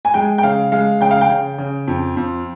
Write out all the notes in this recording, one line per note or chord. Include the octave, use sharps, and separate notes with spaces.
G#5
G#3 G5
G5
C#3 F5
G#3 F5
C#3 G5
F5
G5
C#3
C#3
F2
F2